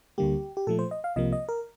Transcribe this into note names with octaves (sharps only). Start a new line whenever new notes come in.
D2 D3 G3 A#3 G4
G4
A#2 F3 A3 A4
C5
D#5
F5
C2 C3 F3 A#3 D#5
D#5
A#4